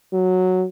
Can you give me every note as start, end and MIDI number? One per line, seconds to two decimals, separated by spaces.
0.13 0.66 54